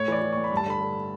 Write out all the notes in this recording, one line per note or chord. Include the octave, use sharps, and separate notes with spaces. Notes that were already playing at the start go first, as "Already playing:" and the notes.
Already playing: A2 C#5
E3 D5
E3
A2 C#6
B5
G2
A5
D3 B5
D3